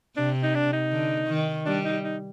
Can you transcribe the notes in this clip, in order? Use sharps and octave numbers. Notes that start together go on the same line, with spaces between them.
C3 D4
D#4
D4
D#4
D3
D#3
G3 D4
D#4
D#4